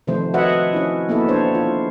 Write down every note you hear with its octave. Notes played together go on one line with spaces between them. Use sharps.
C3 D#3 F3 A3 C4 C5
F#4 B4 C#5 D#5 E5 F#5
C#4 E4
A#3 B3 E4 A4
D4 C5 C#5
F4